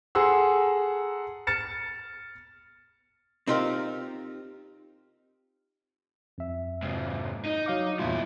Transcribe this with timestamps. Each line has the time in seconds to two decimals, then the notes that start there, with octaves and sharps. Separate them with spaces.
0.15 G#4 A4 F#5 A#5 C6 E6
1.47 F6 A6 C#7 E7
3.47 C4 D#4 F4 G4 A#4
6.38 F2 E5
6.83 G#2 C3
7.46 D#4
7.66 F#3 F5 D6
7.99 E2 G2 A#2 E4 F4